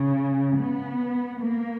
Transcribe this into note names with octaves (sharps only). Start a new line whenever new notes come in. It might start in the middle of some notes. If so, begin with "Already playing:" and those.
Already playing: C#3
B3
A#3